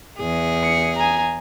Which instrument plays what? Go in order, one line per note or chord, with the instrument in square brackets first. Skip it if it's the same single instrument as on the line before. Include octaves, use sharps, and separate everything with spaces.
[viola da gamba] E2 G#4
[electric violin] C#7
G#5 A#5